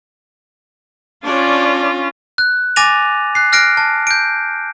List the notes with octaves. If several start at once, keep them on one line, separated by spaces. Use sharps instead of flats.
C#4 D4 F4 C#5 D5
F#6
G#5 D6 A6 A#6 D#7 F7
F#6 C7
F6 F#6 A#6 C7 D7
A5
G6 D7